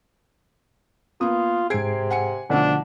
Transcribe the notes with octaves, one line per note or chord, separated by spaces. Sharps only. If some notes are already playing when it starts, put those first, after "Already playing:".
A#3 B3 F4 D#6
G#2 C3 G#4 G#6 C7 D7
F#5 G#5 C#7
B1 D3 F3 A3 D4 F#5